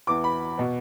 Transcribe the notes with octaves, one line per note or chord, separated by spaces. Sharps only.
E2 E3 B3 D6
B5
B2 B3